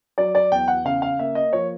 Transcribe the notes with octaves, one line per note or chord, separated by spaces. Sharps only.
F#3 D5
D5
E2 G5
F#5
C#3 F5
F5
A#3 E5
D#5
F3 C#5